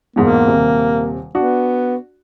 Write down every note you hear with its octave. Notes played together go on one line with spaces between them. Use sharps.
E2 G#2 B2 A#3
D#1 C3
B3 D4 F#4